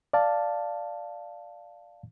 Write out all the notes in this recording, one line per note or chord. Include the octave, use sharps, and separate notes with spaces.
D5 F5 A5